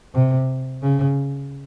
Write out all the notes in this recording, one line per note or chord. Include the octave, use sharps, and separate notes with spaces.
C3
C#3